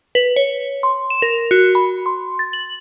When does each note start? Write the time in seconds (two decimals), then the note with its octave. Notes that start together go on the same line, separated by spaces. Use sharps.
0.15 B4
0.36 C#5
0.83 C6
1.10 E7
1.22 A#4
1.51 F#4
1.75 B5
2.06 C6
2.39 A6
2.53 F#7